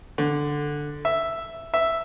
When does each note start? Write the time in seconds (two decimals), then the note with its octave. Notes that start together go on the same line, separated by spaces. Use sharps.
0.18 D3
1.05 E5
1.74 E5